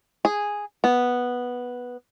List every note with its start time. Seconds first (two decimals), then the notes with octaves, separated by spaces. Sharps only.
0.25 G#4
0.84 B3